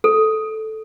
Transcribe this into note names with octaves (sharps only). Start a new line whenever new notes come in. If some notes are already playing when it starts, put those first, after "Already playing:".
A4